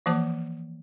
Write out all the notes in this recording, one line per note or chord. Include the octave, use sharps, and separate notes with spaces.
E3 F3 A#3 C5 A5 D6